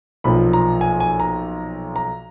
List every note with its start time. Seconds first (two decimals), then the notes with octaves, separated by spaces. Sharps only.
0.24 B1 A#2 F3 B5
0.53 A#5
0.81 G#5
1.00 G#5
1.20 A#5
1.96 A#5